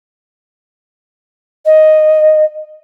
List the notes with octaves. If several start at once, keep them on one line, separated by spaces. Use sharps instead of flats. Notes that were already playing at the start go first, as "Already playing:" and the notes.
D#5